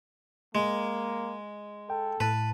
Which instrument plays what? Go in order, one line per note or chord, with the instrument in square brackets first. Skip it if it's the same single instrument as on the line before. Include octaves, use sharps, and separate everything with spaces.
[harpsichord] G#3 [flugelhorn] A#3
[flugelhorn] A4 [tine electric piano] G5
[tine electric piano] A2 A5 [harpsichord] B4